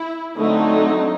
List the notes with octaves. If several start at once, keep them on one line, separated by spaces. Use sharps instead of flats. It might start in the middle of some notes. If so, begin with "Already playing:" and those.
Already playing: E4
D3 F#3 A3 C4 D#4